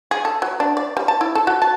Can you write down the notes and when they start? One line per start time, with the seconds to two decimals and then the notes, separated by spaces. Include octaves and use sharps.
0.11 G#4
0.25 A4
0.42 F#3
0.60 D4
0.77 D5
0.97 G3
1.08 A5
1.21 E4
1.35 A4
1.47 F#4
1.62 A5